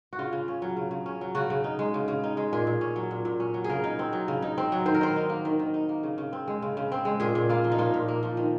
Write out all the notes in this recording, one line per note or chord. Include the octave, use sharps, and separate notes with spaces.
F#4
C#3 F4
C#3
C#4
F#3
C#3
C#3
C#4
F#3
C#3 F#4
C#3
D#4
G#3
C#3
C#3
D#4
G#3
A#2 G#4
A#2
C#4
F#3
A#2
A#2
C#4
F#3
G#4
C#3 A#4
D#4
C4
F#3
C#3
D#4
C4
F#3
D#3 C5
A#4
D#3 C5
D#4
A#3
D#3
D#3
D#4
A#3
C#3
C#3
C4
G#3
C#3
C#3
C4
G#3
A#2 G#4
A#2
A#3 F4
F3
D#4
A#2 F4
A#2
A#3
F3
D#3